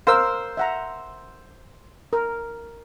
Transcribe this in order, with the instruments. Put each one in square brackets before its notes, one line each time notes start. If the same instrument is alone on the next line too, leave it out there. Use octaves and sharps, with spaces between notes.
[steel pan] A#4 F5 [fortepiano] C5 E6
[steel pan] E5 F#5 A#5
A#4